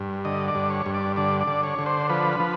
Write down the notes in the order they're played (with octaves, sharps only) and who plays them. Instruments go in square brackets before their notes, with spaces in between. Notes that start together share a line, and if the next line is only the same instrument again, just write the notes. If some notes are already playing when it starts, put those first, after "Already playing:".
Already playing: [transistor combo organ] G2
D3 D#5
D5
G2
C#5
G2
D5
D3 D5
D5
D3
C#5
D3
C5
F3 B4
F3